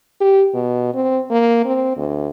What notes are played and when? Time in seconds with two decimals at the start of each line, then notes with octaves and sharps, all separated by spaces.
0.21 G4
0.54 B2
0.94 C4
1.30 A#3
1.65 C4
1.97 D2